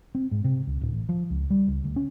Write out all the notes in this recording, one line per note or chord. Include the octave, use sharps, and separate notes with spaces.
C4
G#2
C3
C#2
D1
A1
F3
C#2
G3
C#2
D2
C#4